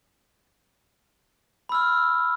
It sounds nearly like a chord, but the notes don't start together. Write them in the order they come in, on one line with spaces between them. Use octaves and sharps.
B5 E6 F6